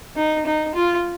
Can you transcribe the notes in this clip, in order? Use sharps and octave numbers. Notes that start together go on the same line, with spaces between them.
D#4
D#4
F4